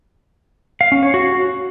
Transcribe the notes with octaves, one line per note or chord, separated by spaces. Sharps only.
F5
C#4
C#5
F#4